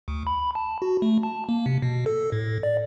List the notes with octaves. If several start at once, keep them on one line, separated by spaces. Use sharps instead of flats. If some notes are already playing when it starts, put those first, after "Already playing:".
D2
B5
A5
F#4
A3
A5
A#3
C3
B2
A4
A2
D5